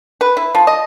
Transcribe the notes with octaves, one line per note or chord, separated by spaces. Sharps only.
B4
E4
F3
D#5